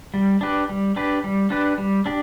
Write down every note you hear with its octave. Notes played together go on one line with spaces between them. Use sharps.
G3
D4 G4 B4
G3
D4 G4 B4
G3
D4 G4 B4
G3
D4 G4